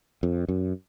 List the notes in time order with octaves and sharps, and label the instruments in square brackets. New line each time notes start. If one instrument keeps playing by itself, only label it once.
[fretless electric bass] F2
F#2